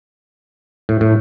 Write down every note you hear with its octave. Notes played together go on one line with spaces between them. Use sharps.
A2
A2